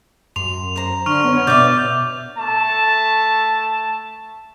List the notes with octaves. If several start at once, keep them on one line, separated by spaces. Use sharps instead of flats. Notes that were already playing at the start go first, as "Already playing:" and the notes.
F#2 C6 F7
C5 A#5
D3 C#6 F6 F7
B3 C#5
B2 D5 E5 G6
A3 A5